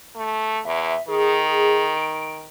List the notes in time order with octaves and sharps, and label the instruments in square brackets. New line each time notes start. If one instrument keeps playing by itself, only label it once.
[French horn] A3
[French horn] E2 [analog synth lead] E5
[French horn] D#3 [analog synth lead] G#4
[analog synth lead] D7